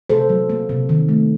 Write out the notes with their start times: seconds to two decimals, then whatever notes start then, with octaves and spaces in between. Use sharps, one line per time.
0.10 C3 A4 C5
0.29 F#3
0.49 A#3
0.69 C3
0.89 D#3
1.09 A3